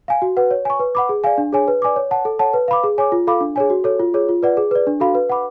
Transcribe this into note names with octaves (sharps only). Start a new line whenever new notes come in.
F5 G#5
F#4
B4 F#5
C#5
G#5 C#6
B4
F#5 B5 D6
G#4
D5 F5 G#5
D4
G#4 C#5 G#5
B4
D5 G#5 D6
C#5
F#5 A5
A4
C#5 F#5 A5
B4
F5 B5 D6
G#4
C#5 G#5 D6
F4
A4 F5 B5 D6
D4
G#4 C#5 G#5
F#4
A4 C#5
F4
G#4 C#5
F4
B4 D5 F#5
G#4
B4 D5
D4
F#4 A4 F5 B5
B4
F#5 B5 D6